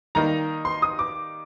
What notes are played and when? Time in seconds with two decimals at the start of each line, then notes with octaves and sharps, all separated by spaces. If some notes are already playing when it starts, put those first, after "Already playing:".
0.15 D#3 G3 A#3 D#4 A#5
0.65 C6
0.82 D#6
0.99 D6